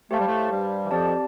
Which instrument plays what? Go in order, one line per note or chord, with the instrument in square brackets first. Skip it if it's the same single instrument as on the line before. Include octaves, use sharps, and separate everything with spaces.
[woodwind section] A3 [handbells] G4 C5 F5 A5
[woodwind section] G3
A2 A3
G2 G3
E3
[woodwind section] F2 F3 [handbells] C4 G4 D5 A5